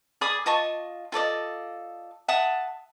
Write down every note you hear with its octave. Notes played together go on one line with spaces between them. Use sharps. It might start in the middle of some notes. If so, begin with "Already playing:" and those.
G#4 D5 B5 D#6
F4 D#5 A5 C#6
F4 A4 D5 D#5
E5 F#5 A5 D#6